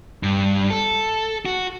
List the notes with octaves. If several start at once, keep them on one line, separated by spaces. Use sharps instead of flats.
G2
A4
F#4